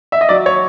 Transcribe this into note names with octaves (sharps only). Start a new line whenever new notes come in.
E5
D#5
F#3 D5
C#5